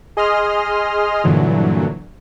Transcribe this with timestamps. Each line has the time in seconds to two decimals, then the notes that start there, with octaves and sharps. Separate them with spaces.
0.17 G#4 D#5 C6 D#6 F6
1.24 G2 A#2 D3 E3 F#3